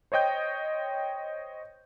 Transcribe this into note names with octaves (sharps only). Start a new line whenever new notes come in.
C5 C#5 D#5 G5 G6